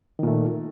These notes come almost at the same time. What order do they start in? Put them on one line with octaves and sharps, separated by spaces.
D#3 A#2 A3